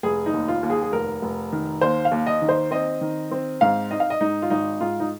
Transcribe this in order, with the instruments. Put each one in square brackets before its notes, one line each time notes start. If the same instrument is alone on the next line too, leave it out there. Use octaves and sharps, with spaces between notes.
[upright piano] F1 G#4
D#4
D#2
F4
D#2
G#4
G#4
F1 A#4
F1
D#3
D#2 C5
F5
D#2
D#5
D#3
C5
C4 D#5
D#3
C4
G#2 F5
D#4 D#5
F5
D#5
G#2 D#4
F4
G#1 D#4
G#2 F4
D#4